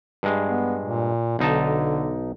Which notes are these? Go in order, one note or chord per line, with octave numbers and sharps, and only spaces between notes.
G2 G#3
B3
A#2
B1 D3 D#4 A5